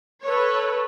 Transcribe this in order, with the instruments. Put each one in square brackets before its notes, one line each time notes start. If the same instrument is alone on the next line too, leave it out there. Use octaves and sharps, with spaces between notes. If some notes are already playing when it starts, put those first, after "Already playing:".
[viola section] A4 B4 C#5